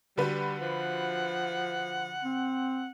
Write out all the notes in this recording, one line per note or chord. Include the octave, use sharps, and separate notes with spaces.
D3 G3 F#4 B4
F3 F#5
C4